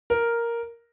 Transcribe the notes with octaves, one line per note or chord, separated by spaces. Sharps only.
A#4